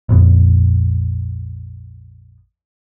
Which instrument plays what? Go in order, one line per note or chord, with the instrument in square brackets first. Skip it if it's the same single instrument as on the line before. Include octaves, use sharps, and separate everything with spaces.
[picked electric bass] A#1 F2 B3